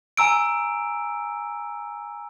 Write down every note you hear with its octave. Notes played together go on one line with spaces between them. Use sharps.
G#5 A#5 E6 D7